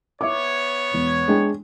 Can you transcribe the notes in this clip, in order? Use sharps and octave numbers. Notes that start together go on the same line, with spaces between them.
B3 C#5 E5 D6
E1
G#3 D4 G5